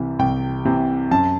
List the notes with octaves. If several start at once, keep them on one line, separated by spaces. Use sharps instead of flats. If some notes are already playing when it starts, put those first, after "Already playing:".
Already playing: C2 C3 E3
C2 G5
C3 E3
F#2 A5